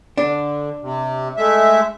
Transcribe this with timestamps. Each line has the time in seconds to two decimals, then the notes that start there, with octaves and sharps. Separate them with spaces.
0.18 D3 D4
0.82 C3
1.37 G#3 A3 E5